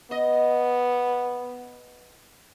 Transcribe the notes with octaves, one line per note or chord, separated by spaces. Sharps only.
B3 D#5